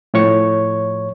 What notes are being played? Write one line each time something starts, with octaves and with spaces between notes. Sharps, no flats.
A2 F3 C#5 C#6